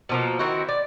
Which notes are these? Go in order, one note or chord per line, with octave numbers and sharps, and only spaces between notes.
B2 F3 A#3
D#3 C4 E4 F#4
D5